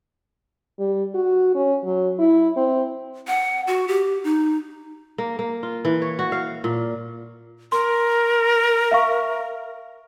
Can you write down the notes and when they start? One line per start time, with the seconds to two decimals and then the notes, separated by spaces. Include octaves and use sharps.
0.79 G3
1.15 F#4
1.56 C#4
1.85 F#3
2.19 E4
2.57 C4
3.27 F#5
3.67 F#4
3.88 G4
4.24 D#4
5.18 A#3
5.39 A#3
5.63 F4
5.85 E3
6.02 C#5
6.19 F#4
6.32 F5
6.64 A#2
7.72 A#4 C6
8.91 E5 F5 C#6